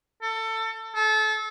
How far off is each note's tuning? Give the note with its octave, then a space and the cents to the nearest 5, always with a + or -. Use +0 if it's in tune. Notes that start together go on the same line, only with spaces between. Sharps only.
A4 +20
A4 -30